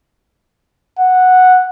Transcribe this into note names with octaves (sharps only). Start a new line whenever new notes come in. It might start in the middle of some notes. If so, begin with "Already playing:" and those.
F#5